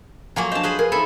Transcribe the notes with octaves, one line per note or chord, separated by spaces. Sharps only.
F3 F#3 A#3 F5 G#5 A#5
D4 C5 D#5 A5
G#4 B4 C5
G#4 A#4 B4
D#4 A4 E5 G#5 B5